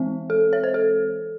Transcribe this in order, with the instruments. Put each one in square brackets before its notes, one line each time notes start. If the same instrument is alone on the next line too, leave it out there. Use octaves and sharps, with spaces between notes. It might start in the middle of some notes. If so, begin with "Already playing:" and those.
Already playing: [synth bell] E3 G#3 C4
A4
C#5
C5
A4